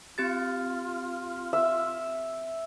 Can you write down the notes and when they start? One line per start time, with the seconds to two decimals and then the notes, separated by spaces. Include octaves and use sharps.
0.18 C4 F4 G4 A6
1.53 E5